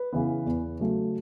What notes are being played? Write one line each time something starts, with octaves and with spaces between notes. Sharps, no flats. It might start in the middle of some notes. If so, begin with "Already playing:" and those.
Already playing: B4
C#3 E3 B3
E2
C#3 F#3 A3